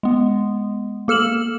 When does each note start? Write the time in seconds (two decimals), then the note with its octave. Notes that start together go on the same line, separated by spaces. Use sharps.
0.03 G#3 B3
1.08 A#3 A4 F6 E7 F#7